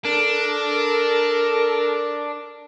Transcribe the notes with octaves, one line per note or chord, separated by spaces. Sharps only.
D4 A4 A#4